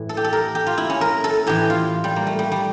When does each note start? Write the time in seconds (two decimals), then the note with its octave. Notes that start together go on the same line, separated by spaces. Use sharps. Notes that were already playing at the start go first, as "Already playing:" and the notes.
Already playing: A2 E3
0.09 A4
0.17 G4
0.24 A4
0.33 A#4
0.55 G4
0.67 F4
0.78 E4
0.90 C#4
1.01 A#4
1.24 A4
1.47 A2 E3 G4
1.70 F4
2.04 G3
2.16 A#3
2.27 A3
2.39 G3
2.52 G3